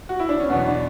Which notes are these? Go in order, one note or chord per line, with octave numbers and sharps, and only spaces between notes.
F#4
E4
D4
C#4
E2 B2 F#3 B3
D4